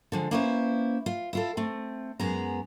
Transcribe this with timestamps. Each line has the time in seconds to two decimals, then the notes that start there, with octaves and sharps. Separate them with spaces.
0.12 D3 F3 G#3
0.31 A#3 B3 C#4 E4 B4 C5
1.06 F4
1.33 E4 F4 A4
1.57 A3 C4
2.20 F#2 G#3 B3 G#4 A#5